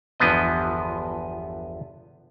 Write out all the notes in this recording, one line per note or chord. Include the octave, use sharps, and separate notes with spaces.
G1 E2 D3 F3 B3 D#5